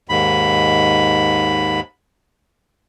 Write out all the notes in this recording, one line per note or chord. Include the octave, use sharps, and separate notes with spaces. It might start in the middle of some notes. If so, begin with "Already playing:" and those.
D#2 G#2 B5